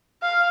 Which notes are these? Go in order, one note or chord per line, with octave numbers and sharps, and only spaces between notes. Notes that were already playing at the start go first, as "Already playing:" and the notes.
F5